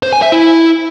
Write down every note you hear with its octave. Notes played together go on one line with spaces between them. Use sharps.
C5
G#5
E5
E4